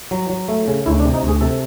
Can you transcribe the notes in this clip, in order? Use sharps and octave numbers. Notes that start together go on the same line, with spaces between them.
F#3
F#3
A3
C#3
D2 E4
D4
C3
D#4
D2 G#4
C3 A4